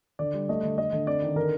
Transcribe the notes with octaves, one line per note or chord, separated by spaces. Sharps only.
D3 D5
G3
A3 D#5
D3
A3 D#5
D3
C4 D5
D#3
D3 A#4